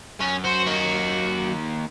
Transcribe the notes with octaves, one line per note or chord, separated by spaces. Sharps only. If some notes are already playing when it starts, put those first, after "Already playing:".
F#2 C#4
F#4 C5
A#3 D#4